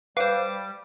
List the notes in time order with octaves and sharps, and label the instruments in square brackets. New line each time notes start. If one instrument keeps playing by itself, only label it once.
[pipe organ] G3 [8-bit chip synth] B4 C5 [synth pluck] F5 [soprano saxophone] D6